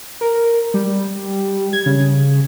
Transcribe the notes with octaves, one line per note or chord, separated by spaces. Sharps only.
A#4
G3
G#6
C#3